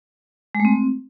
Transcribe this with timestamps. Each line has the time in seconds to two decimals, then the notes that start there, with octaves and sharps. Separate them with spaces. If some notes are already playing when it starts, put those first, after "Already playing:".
0.55 G#3
0.60 A3
0.65 C4